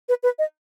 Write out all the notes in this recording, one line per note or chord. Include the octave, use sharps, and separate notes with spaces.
B4
B4
D#5